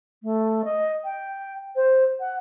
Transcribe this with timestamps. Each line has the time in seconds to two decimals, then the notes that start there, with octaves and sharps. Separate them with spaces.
0.23 A3
0.65 D#5
1.04 G5
1.76 C5
2.20 F#5